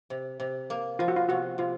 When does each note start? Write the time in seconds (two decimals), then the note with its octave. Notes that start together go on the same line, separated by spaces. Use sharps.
0.10 C3
0.40 C3
0.70 A#3
0.99 F3 F4
1.08 F#4
1.16 F4
1.29 C3 F#4
1.58 C3 F4